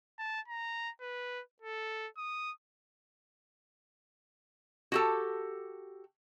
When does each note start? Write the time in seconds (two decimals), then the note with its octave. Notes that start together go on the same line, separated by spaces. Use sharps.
0.19 A5
0.48 A#5
1.01 B4
1.62 A4
2.17 D#6
4.92 F#4 G4 A4